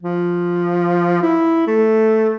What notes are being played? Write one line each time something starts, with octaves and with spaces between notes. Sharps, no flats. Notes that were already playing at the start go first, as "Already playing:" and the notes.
F3
E4
A3